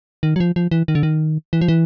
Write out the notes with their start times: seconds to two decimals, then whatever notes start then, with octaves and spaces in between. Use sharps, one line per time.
0.23 D#3
0.36 F#3
0.40 F3
0.56 F3
0.71 E3
0.88 D#3
0.95 D3
1.03 D#3
1.53 E3
1.61 F3
1.68 E3